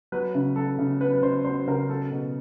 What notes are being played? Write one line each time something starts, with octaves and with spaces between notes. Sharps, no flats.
F#3 B4
C#3
F#3 A4
C#3
F#3 B4
B4
C#3 C5
F#3 C5
C#3 A#4
F#3 A4
B2